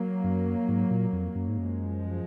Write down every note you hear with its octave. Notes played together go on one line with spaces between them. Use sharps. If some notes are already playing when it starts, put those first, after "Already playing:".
Already playing: F#3 A#3
F#2
G#2
A#2
F2
F#2
G#2
F#2 F3 G#3